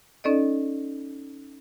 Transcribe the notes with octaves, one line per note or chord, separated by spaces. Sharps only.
C#4 D#4 A4 D5 D#5